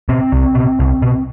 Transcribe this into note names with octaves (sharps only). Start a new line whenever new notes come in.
B2 C4
C2
B2
C2
B2